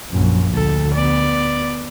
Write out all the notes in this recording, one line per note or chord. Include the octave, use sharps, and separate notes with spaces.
A#1 F#2
D2 A4
B3 D5